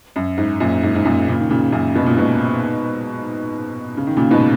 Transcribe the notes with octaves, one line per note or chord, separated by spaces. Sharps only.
F#2
G#2
F#2 A#2
G#2
G#2
F#2 A#2
A#2 C#3
D#3
A#2 C#3
F#2 A#2
B2
A#2
G#2 B2
C#3
D#3
A#2 C#3
G#2 B2